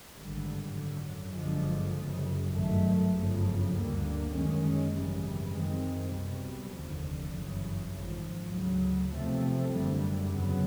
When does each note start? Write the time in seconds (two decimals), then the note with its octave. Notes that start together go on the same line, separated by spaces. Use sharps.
0.14 G#1 G2 D3 G3
0.73 F#2 D3 F#3
1.33 G1 F#2 D3 F3 G#3
1.93 F#1 F#2 C#3
2.53 G#1 G2 D#3 F#3 A3
3.13 G1 F#2 C#3 F3
3.73 D2 D3 G3 A#3
4.33 F#2 D#3 G#3 C#4
4.92 G#1 F#2 C#3 E3 G3
5.52 F#2 D#3 G#3 C4
6.12 C2 B2 G3
6.72 F1 D#2 D3 F3
7.32 G1 F#2 C#3 E3
7.92 G#1 G#2 F3
8.52 D2 C#3 F#3
9.12 E2 C3 F3 A3 C4
9.71 F#1 F#2 D3 G3
10.31 E2 C#3 F#3 B3